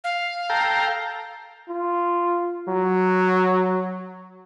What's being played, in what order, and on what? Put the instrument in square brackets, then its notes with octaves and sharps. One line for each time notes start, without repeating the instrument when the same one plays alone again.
[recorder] F5
[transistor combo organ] A4 G5 A#5
[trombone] F4
F#3